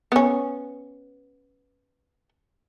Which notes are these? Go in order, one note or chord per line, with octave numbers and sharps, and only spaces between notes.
B3 C#4